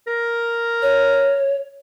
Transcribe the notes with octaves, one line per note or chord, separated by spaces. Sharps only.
A#4
C#5